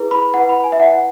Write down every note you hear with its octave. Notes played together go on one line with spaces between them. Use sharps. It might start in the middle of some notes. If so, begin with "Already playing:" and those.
Already playing: E4 G#4 B4
B5
E4 B4 F#5
B5
G#5
E5
E4 B4 F#5
F#5